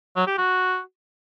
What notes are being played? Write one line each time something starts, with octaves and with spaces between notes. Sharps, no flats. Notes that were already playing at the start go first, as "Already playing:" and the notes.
F#3
G4
F#4